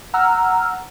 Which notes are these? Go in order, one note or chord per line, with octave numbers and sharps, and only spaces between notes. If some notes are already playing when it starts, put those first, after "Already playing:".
F#5 A#5 E6 F6